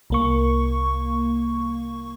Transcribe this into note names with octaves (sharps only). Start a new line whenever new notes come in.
C2 A#3 C#6